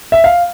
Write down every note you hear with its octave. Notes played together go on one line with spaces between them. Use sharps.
E5
F5